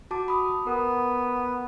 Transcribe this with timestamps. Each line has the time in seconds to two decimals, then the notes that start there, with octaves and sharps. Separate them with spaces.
0.11 F#4 A5 D6
0.28 B5 D#6
0.67 B3 A#4